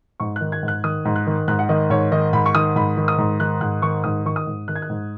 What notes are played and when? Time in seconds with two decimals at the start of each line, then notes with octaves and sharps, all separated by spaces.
0.20 G#2 C#6
0.36 D#3 F#6
0.52 G#6
0.63 G#2
0.68 F#6
0.84 D#3 D#6
1.05 G#2
1.16 F#6
1.27 D#3
1.48 G#2 F#6
1.59 F#5
1.69 D#3 D#5
1.90 G#2 C#5
2.11 D#3 D#5
2.33 G#2 B5
2.46 C#6
2.55 D#3 D#6
2.76 G#2 B5
2.97 D#3
3.08 D#6
3.18 G#2
3.40 D#3 F#6
3.61 G#2 F#6
3.82 D#3 C#6
4.04 G#2 D#6
4.25 D#3 C#6
4.36 D#6
4.47 G#2
4.68 D#3 F#6
4.75 G#6
4.82 F#6
4.90 G#2